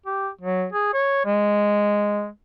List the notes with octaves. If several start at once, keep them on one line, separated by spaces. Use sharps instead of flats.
G4
F#3
G#4
C#5
G#3